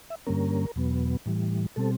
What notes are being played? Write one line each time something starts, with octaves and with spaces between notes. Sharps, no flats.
E5
G2 D3 G3 A#3 C#4 A#4
E2 B2 F#3 B3
A2 E3 G3
B2 G3 C4 A4